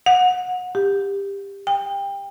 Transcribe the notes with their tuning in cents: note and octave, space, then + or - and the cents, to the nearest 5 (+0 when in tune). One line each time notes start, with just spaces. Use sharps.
F#5 -25
G4 +20
G5 +25